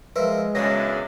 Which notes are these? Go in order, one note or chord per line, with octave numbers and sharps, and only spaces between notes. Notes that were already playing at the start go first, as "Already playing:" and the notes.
F3 G#3 A#4 B4 E5
F#2 C#3 E3 B3 D4 G#4 A#6